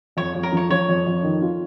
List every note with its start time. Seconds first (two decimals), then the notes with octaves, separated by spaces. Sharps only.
0.17 F2 C#5
0.35 F2
0.43 A#4
0.52 F3 C#5
0.70 F3 C#5
0.89 F2
1.06 F2
1.23 D#3
1.42 F4